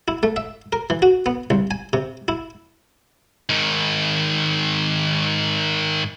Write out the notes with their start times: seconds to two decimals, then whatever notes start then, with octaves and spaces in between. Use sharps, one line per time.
0.08 E4
0.23 A3
0.36 E5
0.73 A#4
0.90 E3
1.02 F#4
1.26 B3
1.50 C2
1.71 G#5
1.93 C3
2.28 E4
3.49 G#2 D#3